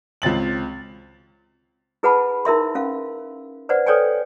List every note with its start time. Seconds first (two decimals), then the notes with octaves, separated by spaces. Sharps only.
0.22 C#2 C4 A6 F#7
2.03 E4 G#4 B4 F#5 A5 B5
2.45 D#4 E4 A#4 E5 C6
2.75 C#4 F5
3.69 B4 C5 D5 F#5
3.86 A4 B4 C#5 D5 G5 G#5